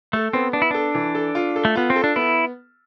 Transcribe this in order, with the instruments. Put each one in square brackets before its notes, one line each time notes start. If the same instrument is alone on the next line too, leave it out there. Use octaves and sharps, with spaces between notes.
[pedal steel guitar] A3 [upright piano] A4
[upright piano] B3 [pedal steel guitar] C4
[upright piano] B3 [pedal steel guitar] D4
[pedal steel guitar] E4
[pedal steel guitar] D4 [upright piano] A4
[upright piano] E3
A4
F4
A4
[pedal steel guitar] A3
[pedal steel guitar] B3 [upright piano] F4
[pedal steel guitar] C4
[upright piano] A4
[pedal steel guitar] D4
[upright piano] B3 [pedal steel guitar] E4